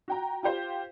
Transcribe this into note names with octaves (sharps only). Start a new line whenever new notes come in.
F#4 G5 A#5
F4 G4 C5 F5